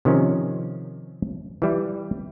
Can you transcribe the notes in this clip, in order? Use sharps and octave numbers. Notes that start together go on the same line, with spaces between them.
C3 D#3 F3 C#4
E3 G3 E4